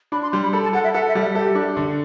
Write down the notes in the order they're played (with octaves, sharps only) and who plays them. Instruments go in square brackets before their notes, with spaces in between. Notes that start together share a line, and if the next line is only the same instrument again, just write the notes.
[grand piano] D4 [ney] B5
[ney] C6
[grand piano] G3 [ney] C6
[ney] B5
[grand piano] A4 [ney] B5
[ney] A5
[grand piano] A4 [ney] F#5
[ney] E5
[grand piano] A4 [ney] F#5
[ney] E5
[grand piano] G3
[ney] E5
[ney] G4 [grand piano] A4
[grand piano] D4
D3